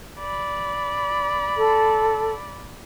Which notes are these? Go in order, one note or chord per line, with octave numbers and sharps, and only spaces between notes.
D5 B5
A4